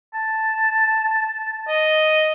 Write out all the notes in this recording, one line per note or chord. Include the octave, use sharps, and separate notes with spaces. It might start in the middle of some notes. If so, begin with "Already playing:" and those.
A5
D#5